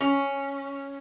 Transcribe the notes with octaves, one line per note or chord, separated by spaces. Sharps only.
C#4